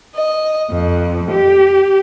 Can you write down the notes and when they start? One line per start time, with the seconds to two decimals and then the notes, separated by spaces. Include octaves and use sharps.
0.15 D#5
0.70 F2
1.31 G4